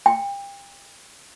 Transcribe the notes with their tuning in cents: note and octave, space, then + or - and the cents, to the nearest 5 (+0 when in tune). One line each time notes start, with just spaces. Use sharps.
G5 +30